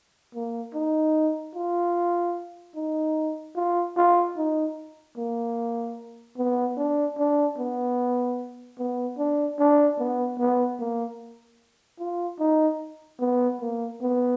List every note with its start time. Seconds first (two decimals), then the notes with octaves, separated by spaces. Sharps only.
0.35 A#3
0.74 D#4
1.55 F4
2.75 D#4
3.56 F4
3.97 F4
4.37 D#4
5.17 A#3
6.37 B3
6.77 D4
7.18 D4
7.58 B3
8.78 B3
9.18 D4
9.59 D4
9.99 B3
10.39 B3
10.80 A#3
12.00 F4
12.39 D#4
13.20 B3
13.61 A#3
14.01 B3